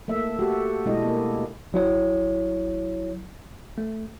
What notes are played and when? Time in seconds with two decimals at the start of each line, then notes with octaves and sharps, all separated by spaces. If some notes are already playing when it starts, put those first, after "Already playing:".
0.08 A3 A#3 E5
0.39 A3 F#4 G4 A4
0.86 B2 G#3 A3 D4 E4 D#5
1.05 A#3
1.73 G#1 F#3 E4 C#5
3.78 A3